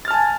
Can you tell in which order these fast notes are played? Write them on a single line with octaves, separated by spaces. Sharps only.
A6 F6 A5 G#5